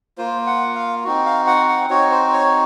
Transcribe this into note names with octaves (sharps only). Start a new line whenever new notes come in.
A#3 F4 C5
F#5
F5
C4 D#4 F#4
F5
F#5
F#5
C4 D#4 F#4 C#5
C5
C#5